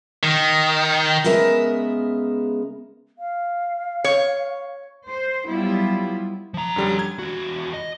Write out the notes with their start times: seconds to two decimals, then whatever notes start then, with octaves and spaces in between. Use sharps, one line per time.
0.23 D#3
1.24 C#3 G#3 B3 A#4 E5
3.19 F5
4.04 C#5
5.09 C5
5.47 F#3 G3 B3 E4 F4
6.54 F3 A#5
6.76 F#2 D3 G3
6.99 G#6
7.19 E2 F#4
7.74 D#5